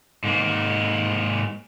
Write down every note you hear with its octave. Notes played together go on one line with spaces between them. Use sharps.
G#2 A#3